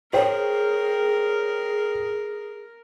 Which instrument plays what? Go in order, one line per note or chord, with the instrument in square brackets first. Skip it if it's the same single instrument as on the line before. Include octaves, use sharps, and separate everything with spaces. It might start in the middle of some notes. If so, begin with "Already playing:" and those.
[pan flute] G#4 [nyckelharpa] A#4 [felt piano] C5 C#5 G5